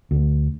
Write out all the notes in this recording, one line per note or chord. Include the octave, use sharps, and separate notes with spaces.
D2